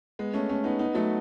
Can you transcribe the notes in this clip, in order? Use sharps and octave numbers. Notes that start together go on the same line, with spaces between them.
G#3 B3
A3 C#4
A3 C#4
B3 D#4
B3 D#4
F#3 A3